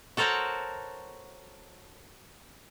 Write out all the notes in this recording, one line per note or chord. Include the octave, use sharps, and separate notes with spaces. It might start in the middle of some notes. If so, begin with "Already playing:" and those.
F#4 A4 A#4 C5 C#5 F#5